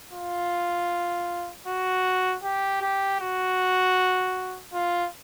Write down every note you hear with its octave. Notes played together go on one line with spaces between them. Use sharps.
F4
F#4
G4
G4
F#4
F4